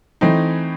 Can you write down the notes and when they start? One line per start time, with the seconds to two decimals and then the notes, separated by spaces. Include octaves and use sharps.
0.21 E3 A3 C4 D#4